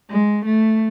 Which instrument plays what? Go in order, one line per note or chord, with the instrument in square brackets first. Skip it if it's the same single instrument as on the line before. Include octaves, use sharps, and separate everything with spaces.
[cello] G#3
A3